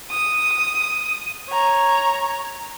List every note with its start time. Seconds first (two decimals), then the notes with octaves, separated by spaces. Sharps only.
0.11 D#6
1.49 C#5 A#5